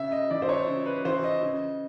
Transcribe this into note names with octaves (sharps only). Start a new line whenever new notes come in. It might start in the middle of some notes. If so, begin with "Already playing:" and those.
Already playing: C#3 E5
D#5
E3 D5
C5
C#5
C#3
B4
E3 C5
D#5
C#3